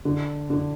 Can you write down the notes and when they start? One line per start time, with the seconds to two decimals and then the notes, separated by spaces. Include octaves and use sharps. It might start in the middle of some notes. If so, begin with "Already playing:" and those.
0.05 D3
0.50 D3